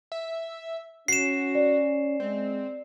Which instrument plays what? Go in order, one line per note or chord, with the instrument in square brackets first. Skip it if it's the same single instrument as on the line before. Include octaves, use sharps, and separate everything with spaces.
[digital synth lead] E5
[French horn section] C#4 [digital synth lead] F#4 [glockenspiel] C7 E7
[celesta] D5
[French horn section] G#3 [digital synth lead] C4